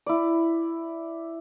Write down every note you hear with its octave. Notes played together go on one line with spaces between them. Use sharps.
E4 D5